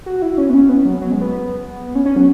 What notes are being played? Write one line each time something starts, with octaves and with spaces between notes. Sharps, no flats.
F#4
E4
C#4
B3
C#4
B3
F#3
F#3
G#3
B3
C#4
C#4
F#3